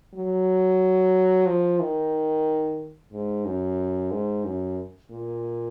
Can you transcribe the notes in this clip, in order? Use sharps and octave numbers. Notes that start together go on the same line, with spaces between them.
F#3
F3
D#3
G#2
F#2
G#2
F#2
A#2